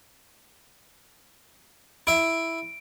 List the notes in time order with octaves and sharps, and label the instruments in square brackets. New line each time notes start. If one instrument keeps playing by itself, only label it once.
[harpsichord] E4 E5 [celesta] D7